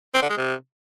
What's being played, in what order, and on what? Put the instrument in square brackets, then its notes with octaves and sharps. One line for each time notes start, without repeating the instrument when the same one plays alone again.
[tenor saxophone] C4
D3
G#3
C3